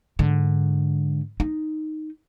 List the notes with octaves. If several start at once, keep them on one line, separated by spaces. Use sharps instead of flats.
G#2 D3
D#4